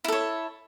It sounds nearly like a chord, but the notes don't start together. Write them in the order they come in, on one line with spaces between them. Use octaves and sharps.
E4 A4 C#5